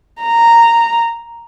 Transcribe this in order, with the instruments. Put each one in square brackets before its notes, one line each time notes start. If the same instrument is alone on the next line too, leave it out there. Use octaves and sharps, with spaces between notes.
[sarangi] A#5